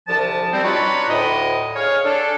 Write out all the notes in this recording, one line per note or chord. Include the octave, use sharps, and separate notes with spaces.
C2 D3 F3 A5
G3 C4
D4 D#4 F4 F#4 B4 C#5
D2 A2 D#5
G#4 C#5 F5
D4 A4